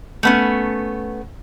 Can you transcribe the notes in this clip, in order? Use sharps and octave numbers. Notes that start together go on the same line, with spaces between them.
A3 B3 C#4